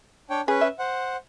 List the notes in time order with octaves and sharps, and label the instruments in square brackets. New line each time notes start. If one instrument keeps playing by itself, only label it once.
[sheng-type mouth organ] D4 C#5 G5
[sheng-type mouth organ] C#4 B4 [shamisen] G#4
[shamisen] E5
[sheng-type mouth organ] C5 F#5